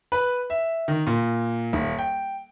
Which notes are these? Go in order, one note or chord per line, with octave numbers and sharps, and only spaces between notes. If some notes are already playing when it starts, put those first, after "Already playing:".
B4
E5
D#3
A#2
D#1
G5